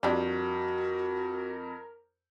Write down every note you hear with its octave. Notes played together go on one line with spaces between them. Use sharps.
F2 G3 D4 F4 F#4 A#4